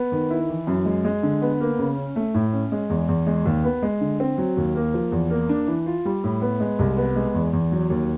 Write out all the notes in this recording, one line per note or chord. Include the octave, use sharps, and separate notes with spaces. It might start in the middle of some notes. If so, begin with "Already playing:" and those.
Already playing: B3
D#3
E4
E3
F#2
G#3
G#3
D3
B3
A#3
C#3
C#4
A3
A2
C#4
G#3
E2
E2
G#3
D#2
B3
G#3
D3
C4
F#3
D#2
A#3
F3
E2
A#3
D4
E3
F4
G3
A2
B3
G#3
C2
B3
G#3
E2
E2
F#3
D#2